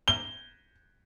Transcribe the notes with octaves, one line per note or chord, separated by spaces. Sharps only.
G7